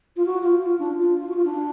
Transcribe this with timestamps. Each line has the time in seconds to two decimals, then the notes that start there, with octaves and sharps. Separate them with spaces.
0.16 F4
0.26 F#4
0.43 F4
0.62 F4
0.79 D4
0.97 F4
1.21 F4
1.29 F#4
1.36 F4
1.45 D4